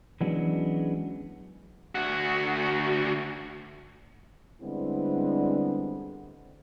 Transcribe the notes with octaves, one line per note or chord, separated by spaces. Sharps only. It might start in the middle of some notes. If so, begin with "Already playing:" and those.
E3 F#3 G#3 B3 C#4 D4
D2 F#4
D3 G3 G#3 B3 C4 E4